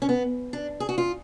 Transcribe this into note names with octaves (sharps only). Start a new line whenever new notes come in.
C#4
B3
D4
G#4
F#4
F4